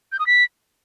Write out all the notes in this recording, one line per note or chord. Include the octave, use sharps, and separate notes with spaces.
G6
D#6
B6